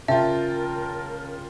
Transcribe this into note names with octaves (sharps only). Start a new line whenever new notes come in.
C#3 F4 A#4 E5 G5 A5